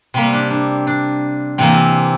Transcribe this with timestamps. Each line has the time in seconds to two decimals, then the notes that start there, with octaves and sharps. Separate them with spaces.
0.14 C3 G3 A#3 C4
0.33 D4
0.50 D4
0.87 D4
1.58 C3 E3 A#3 C4